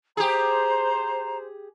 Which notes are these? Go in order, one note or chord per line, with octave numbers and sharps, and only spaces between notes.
G4 G#4 C5 A#5